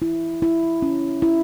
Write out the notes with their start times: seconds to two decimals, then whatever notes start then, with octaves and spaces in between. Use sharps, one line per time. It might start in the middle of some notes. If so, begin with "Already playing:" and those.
0.02 E4
0.42 E4
0.82 C#4
1.22 E4